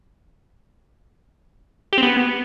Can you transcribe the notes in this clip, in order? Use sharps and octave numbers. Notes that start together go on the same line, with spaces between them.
G4
C4
B3